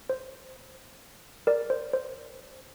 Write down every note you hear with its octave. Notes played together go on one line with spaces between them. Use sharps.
C5
A#4 D5
C5
C5